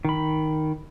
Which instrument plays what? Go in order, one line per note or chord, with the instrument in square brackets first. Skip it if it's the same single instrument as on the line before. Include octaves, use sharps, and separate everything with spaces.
[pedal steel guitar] D#3 B5